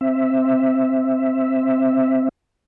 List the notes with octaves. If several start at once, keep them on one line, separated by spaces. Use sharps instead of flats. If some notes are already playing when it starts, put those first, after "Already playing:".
C4 E5